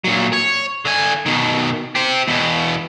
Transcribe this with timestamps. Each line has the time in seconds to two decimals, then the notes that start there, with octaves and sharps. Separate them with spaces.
0.04 A#2 F#3
0.33 C#5
0.85 D3 G#5
1.26 B2 D#3
1.95 G4 C5
2.28 E2 B2